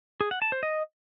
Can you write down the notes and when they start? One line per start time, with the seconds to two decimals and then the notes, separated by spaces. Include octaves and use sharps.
0.21 G#4
0.31 F#5
0.42 A5
0.52 C5
0.63 D#5